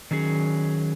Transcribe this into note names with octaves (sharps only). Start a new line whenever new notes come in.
D#3 F#3 C#4 G#4